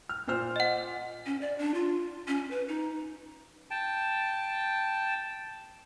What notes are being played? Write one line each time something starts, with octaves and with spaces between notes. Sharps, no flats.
F6
A#2 C5 F6
D#5 F#5
C#4
D5
D4
F4
C#4
B4
D#4
G5 A5